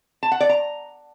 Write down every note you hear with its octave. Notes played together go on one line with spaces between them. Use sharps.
A5
F#5
D5
A#5